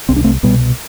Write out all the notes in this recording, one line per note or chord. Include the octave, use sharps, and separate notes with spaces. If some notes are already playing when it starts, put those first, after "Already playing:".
C2 C3 C4
D4
A3 C4
C2 B2 G3 B3